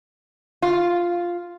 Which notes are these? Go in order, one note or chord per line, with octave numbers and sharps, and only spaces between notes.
F4